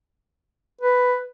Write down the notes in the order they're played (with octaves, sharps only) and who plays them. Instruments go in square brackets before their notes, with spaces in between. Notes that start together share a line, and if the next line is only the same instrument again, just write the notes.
[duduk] B4